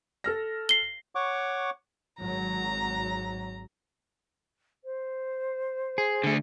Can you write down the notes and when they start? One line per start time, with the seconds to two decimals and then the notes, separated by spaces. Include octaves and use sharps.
0.24 A4 F6 A#6
0.69 C7 G7
1.15 C#5 F#5 C#6 D6
2.20 G#1 F#3 A#5
4.84 C5
5.98 G#4
6.24 D3 A3